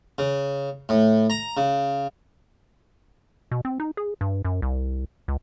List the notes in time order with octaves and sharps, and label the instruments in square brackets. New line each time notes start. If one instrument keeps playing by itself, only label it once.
[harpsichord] C#3
A2
A#5
C#3
[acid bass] B2
C4
D#4
G#4
G2
F#2
C2
C#2